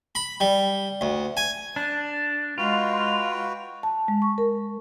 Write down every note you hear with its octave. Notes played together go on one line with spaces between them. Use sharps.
B5
G3
D2
G#5
D4
G#3 F4 F#4 B4 G5
A5
G#3
C#6
A#4